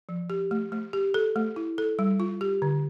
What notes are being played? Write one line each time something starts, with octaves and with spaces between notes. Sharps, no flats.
F3
G4
A3
A3
G4
A4
A3
E4
A4
G3
F4
G4
D3